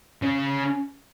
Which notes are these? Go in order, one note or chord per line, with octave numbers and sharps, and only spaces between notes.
C#3